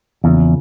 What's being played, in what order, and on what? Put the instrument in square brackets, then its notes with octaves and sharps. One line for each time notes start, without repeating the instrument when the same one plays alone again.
[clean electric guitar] E2 [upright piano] C#3 F3 A#3